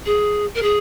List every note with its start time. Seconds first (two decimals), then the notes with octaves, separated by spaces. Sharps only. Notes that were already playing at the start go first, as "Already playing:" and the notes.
0.06 G#4
0.55 A#4
0.62 G#4